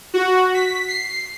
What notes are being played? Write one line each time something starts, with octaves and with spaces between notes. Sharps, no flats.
F#4
B6
C7